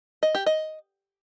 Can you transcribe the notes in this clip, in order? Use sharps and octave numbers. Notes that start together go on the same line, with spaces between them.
D#5
G4
D#5